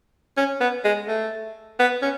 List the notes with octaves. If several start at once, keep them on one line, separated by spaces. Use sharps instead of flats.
C#4
B3
G#3
A3
B3
C#4